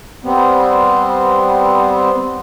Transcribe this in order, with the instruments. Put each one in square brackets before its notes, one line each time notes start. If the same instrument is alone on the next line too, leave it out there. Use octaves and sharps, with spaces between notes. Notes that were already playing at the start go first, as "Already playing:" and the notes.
[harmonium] G3 B3 C4